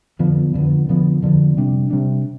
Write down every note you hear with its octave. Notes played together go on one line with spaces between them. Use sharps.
F2 D3 F3 B3
F2 D3 F3 B3
F2 D3 F3 B3
F2 D3 F3 B3
C3 G3 D4
C3 G3 D4